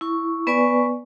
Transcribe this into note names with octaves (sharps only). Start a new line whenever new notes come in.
E4 C#6
B3 B4 D5 G#5 C#6